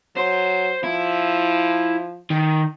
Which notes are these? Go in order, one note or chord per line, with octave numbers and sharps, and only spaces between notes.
F#3 C5
F3 E4
D#3